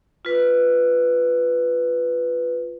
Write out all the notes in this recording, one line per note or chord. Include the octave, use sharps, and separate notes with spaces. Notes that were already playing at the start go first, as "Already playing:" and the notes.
F4 B4